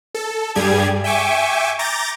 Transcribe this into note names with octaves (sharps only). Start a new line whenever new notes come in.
A4
G2 G3 G4 G#4 G#6
E5 G5 G#5 C#6 D6
A#5 D6 G6 A6 A#6